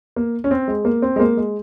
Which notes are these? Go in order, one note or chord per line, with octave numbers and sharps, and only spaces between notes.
A#3
C#4
C4
G#3
A#3
C4
G#3
A#3
G#3